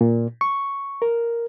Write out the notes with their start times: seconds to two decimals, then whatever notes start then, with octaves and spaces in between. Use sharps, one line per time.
0.01 A#2
0.41 C#6
1.02 A#4